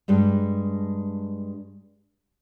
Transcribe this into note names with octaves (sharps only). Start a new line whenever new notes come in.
G2 G3 G#3